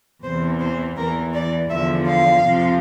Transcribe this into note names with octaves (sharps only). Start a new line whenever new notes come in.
E2 C3 E3 C5
C5
E2 E3 A#4
D5
E2 D3 F3 E5
F5
F2 C3 F3